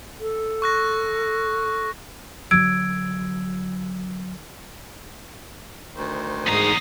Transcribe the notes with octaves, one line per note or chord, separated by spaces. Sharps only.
A4
C#6 F#6 A#6
D3 F#3 E6 G#6 D7
D2 D#3 C5
E2 G#2 A#5 D#6 C7